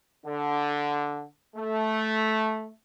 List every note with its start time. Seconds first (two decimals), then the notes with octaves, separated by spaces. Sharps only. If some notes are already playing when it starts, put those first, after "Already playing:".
0.25 D3
1.56 A3